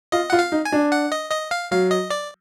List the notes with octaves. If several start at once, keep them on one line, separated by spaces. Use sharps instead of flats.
F4 D#5
F4 F#5
F5
D#4
G#5
D4
F#5
D#5
D#5
F5
F#3 F5
D#5
D5